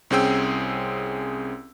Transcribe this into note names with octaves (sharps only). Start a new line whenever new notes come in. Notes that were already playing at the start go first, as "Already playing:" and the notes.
C2 C4 C#4 G#4 G5 E6